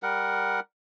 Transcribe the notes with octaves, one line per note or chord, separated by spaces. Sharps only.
G3 A#4 F#5